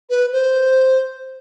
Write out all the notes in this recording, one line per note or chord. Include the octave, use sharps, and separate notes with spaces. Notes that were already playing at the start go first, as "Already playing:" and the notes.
B4
C5